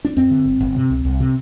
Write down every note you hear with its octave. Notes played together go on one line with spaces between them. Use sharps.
D4
F#2 C4
D3
G1
G1
C3
C2
C2
C3